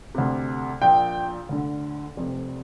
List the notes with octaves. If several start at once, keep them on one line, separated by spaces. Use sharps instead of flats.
D2 C3
A#1 A#2 G5
D2 D3
F1 F2 C3